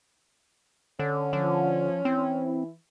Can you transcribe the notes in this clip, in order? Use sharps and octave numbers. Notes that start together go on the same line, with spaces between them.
D3 C#4
D3 F3
E3 C4 E4